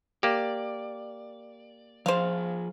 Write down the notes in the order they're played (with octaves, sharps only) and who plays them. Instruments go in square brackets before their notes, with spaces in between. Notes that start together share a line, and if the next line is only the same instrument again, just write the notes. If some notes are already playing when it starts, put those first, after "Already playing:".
[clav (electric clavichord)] A#3 G4 [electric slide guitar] D5
[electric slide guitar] F3 G#4 [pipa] C5 F5